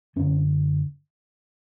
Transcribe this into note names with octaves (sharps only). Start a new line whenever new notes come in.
F#2 D3 C#4